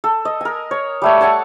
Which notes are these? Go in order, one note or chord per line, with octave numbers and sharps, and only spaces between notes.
A4
D#5
A#4 G#5
C#5
G3 A3 C#5
A4 F#5 G#5 A5